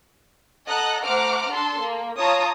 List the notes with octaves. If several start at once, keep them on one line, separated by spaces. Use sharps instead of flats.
A4 D#5 F#5 A#5 F#6
A3 C5 F#5 A#5 D6 F6
D4 A4 C6
A#3
F4 C#5 A5 A#5 D#6